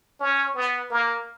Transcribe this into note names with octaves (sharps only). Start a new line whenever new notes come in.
C#4
B3
A#3